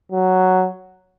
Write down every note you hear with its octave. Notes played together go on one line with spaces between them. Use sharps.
F#3